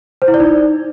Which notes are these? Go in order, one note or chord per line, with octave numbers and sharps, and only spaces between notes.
C5
E4
D5
D#4